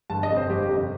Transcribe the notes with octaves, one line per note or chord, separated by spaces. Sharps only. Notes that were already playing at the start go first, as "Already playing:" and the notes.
G1 A5
D#5
F2 C3
C5
G1 G4
F2 C3